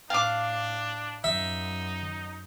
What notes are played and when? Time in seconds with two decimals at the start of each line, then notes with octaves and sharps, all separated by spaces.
0.10 A2 D4 F5 D6
1.24 F#2 D#4 E5